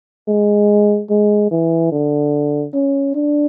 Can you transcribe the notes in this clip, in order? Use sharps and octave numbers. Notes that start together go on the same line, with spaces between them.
G#3
G#3
E3
D3
C#4
D4